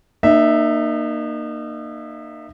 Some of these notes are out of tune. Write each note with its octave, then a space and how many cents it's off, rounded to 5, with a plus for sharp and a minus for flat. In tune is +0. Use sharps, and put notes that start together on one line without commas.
A#3 +0 D#4 -35 E5 -5